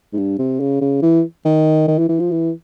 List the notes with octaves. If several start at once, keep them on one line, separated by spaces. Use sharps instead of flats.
G#2
G2
C3
C#3
C#3
E3
D#3
D#3
E3
E3
F3
E3